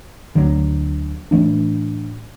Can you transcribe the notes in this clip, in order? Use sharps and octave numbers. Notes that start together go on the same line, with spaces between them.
D2 D3 F#3
A2 E3 A3 D4